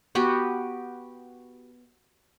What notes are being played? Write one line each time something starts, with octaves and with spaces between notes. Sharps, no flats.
B3 F#4 G4